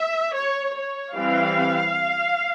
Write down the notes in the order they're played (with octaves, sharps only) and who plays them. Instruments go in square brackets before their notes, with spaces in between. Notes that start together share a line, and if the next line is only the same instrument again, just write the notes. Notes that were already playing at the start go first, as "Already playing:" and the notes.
Already playing: [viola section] E5
C#5
C#5
E3 G3 C4 F5